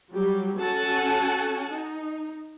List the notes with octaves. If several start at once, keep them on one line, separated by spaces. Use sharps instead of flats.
F#3 G3 G4
C#4 F#4 A4 F#5 G#5 A5
D#4